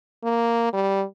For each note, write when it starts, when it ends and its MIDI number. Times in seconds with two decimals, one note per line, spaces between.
0.24 0.69 58
0.73 1.03 55